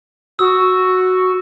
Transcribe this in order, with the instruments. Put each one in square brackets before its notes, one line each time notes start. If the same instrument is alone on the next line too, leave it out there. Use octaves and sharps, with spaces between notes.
[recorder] F#4 [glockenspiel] D#6 E6